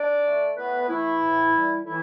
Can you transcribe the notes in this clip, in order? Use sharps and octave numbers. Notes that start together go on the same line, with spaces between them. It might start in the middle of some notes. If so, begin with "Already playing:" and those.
Already playing: D4 D5
D3 A3
A2 B3 B4
E3 A3 E4
A2
G3
A2 E3 E4